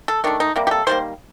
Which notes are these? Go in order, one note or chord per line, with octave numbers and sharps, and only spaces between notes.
A4
D#3 A3 D4
D#4
C3 G3 A#3
G4
A4
D#3 G3 A#3 C5